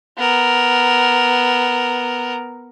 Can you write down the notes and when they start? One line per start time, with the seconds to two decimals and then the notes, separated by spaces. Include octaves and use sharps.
0.18 B3 A#4